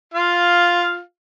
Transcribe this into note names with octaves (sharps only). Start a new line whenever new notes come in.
F4 F5